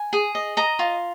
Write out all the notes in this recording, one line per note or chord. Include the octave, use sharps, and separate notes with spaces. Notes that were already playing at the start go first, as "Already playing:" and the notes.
Already playing: G#5
G#4
D#5
D#5 A#5
F4